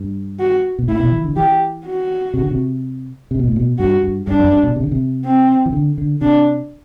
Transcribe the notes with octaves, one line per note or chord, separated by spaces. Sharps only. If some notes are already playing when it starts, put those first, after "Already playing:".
Already playing: G2
F#4
B2
A2 E4
B2
E3
D3
E3 G4
F#4
C3
D3
C3
C3
B2
A2
B2
G2 F#4
G2
G2 D4
F#2
G2
B2
C3
D3
C3
C4
E3
D3
D3
C3 D4